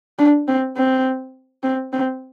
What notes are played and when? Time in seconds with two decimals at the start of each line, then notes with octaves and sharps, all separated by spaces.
0.19 D4
0.48 C4
0.77 C4
1.63 C4
1.93 C4